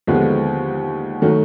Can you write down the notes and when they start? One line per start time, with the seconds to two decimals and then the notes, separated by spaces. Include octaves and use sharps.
0.07 D#2 D3 F3 G#3 B3
1.22 D#3 F#3 A3